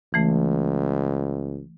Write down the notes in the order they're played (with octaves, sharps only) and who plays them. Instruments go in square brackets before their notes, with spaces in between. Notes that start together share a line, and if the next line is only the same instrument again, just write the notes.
[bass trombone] C#2 [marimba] E3 A3